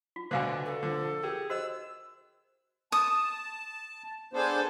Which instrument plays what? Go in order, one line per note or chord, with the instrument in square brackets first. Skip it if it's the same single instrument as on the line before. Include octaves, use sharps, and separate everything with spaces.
[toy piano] F4
[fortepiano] D2 B2 D3 [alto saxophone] B4 [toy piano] C5 F5 G#5
[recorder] A4
[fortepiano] D3 [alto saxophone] F3
[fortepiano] G4 [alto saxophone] G#4 [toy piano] A#4
[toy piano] F#4 C5 D#5 [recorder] E6
[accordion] A5 [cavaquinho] D#6
[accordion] B3 D4 C5 [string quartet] G#4 A4 G#5